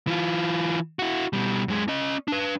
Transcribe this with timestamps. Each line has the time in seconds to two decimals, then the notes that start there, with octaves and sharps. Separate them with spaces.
0.07 E3 F4
0.99 E4 F#4
1.33 B2 G3
1.68 F#2 G#3
1.88 C#4 D#5
2.28 D4 B4